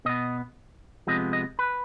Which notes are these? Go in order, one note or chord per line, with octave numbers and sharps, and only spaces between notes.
B2 B3 D#5
C3 F3 G#3 B3 D#5
D#5
B4